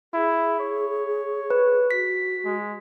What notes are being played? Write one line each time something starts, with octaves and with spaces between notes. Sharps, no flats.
E4 G#4
C#5
B4
F#4 B6
G#3